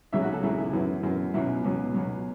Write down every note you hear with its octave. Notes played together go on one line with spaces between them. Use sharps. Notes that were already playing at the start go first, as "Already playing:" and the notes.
C#2 C#3 F#3 E5
F#4
A4
C#2 C#3 F#3 E4
E4
F#2 E3 E4
F#2 E3
C#2 B2 F#3 E4
C#2 B2 F#3
C#2 B2 F#3